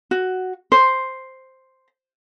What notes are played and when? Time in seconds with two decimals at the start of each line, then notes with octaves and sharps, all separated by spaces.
0.11 F#4
0.72 C5